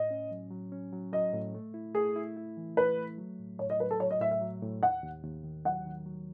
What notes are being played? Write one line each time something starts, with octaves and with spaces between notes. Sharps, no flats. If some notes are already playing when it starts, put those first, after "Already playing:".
Already playing: A2 D#5
C#4
F#3
F#3
C#4
F#3
F#3 D#5
A2
A3
E4
A3 G#4
E4
E4
E3
A3 B4
A3
F#3
A2
A2 C#5
D#5
F#3 B4
A4
F#3 C#5
D#5
A2 E5
E5
F#3
A2
D#2 F#5
D#2
D#2
D#3
F#3 F#5
D#3
F#3